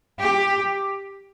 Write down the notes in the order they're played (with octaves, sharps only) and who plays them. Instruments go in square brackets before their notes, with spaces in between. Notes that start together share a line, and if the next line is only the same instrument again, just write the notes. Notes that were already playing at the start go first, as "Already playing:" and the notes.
[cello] G4